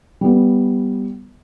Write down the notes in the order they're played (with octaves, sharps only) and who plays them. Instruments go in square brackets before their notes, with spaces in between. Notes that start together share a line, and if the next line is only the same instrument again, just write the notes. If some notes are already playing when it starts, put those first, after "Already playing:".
[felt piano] G3 B3